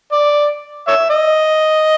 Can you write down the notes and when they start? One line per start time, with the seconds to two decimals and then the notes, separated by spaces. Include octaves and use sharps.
0.12 D5
0.88 C#5 E5
1.10 D#5